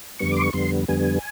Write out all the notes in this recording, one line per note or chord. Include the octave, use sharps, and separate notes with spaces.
F2 D3 G3 B3 C#6
C6 D6
C#6
F2 D3 G3 B3 C6
F2 D3 G3 B3 G#5